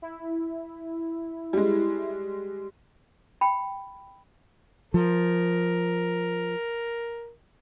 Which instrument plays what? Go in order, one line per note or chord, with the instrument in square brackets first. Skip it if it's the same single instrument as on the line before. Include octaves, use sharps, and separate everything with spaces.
[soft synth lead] E4
[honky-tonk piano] G3 G#3
[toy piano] G5 B5
[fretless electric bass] F3 [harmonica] A#4